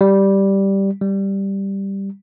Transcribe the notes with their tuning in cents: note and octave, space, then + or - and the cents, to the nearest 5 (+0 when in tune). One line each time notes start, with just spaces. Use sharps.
G3 -5
G3 +0